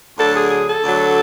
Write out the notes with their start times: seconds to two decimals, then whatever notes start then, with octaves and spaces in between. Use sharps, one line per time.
0.18 D2 D3 F#3 A4
0.34 G#4
0.51 G#4
0.68 A4
0.84 D2 D3 F#3